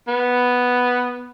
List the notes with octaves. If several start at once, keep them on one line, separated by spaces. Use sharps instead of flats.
B3